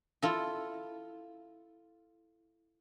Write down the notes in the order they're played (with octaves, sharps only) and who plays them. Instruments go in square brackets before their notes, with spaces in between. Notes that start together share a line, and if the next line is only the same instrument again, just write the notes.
[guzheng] E4 F4 A4